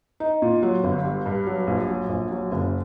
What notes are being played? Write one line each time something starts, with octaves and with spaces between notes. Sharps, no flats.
D#4
A#2
F#3
G1
G3
G2
F#3
A#1
F#3
A#1
F#3
F#1